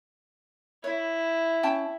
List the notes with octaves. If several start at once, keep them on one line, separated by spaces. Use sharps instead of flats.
E4 C#5
C#4 G5 A5